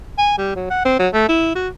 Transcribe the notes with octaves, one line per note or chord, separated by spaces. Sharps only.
G#5
G3
F#3
F#5
C4
F#3
A3
E4
F#4